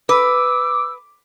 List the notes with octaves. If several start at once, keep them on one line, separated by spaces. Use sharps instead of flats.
B4 D6 E6